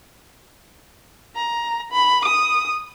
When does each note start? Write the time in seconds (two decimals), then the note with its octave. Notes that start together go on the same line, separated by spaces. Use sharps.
1.36 A#5
1.92 B5
2.25 D#6